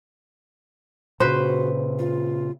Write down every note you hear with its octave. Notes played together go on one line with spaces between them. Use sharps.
A#2 C#3 F#4 B4 C5
F4